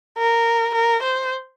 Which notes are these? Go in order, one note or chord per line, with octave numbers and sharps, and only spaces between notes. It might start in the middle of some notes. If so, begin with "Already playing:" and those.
A#4
A#4
C5